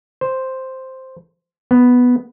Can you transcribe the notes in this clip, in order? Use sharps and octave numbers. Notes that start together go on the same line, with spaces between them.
C5
B3